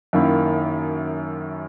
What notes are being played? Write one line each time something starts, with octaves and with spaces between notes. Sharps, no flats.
F#2 D#3 A#3 E4